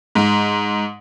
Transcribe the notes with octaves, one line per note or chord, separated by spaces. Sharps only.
G#2